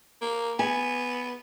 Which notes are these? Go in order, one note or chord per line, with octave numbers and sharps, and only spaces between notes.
A#3
B3 G#5